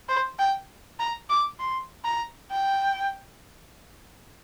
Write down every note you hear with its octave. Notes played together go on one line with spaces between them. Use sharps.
C5
G5
A#5
D6
C6
A#5
G5